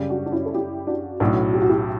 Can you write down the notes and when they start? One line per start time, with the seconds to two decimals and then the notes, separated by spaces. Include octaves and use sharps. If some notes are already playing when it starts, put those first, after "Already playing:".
Already playing: F#2 C#3 G3
0.10 D4 F#4
0.26 D4
0.32 C#4 E4
0.46 A4
0.54 E4 G4
0.87 D4 F#4
1.20 B1 A2 F#3 C#4 D4 E4 F#4
1.54 G4
1.62 F#4
1.69 E4 G4